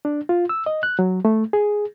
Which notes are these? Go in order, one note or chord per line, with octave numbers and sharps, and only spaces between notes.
D4
F4
E6
D#5
F#6
F#3
A3
G#4